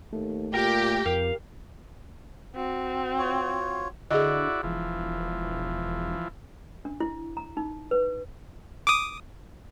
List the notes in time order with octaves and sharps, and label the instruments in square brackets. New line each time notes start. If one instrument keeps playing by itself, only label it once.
[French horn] D#2 [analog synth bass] A3
[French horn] A#2 [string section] G4 [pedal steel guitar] A#4
[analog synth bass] F2 [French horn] A#4 [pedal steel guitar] F5
[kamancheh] C4 [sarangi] F#4
[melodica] F4 C#5
[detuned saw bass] D3 [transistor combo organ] E4 F#4 D5 [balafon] G#4 D#5
[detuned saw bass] E1 [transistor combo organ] E3 F3
[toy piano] D4
E4
A#5
D#4
B4
[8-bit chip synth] D6 D#6